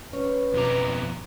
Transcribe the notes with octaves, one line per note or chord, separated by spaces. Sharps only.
C#4 B4 C#5
F2 B2 B3 A#5 D6